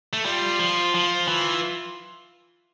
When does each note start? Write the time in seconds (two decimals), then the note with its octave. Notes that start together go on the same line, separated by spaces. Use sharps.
0.13 A3
0.25 G3 F4
0.60 F3
0.95 F3
1.28 E3